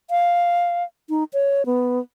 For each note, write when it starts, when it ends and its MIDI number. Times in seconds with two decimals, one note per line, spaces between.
0.10 0.84 77
1.09 1.24 63
1.33 1.66 73
1.66 2.00 59